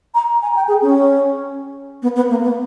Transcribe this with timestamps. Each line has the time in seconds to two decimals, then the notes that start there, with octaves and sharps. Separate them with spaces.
0.15 A#5
0.42 G#5
0.56 G5
0.68 G#4
0.82 C#4
2.02 B3
2.16 B3
2.30 A#3
2.43 B3